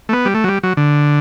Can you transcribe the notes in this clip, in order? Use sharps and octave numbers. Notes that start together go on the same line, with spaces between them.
A3
B3
G3
A3
F#3
G3
F#3
D3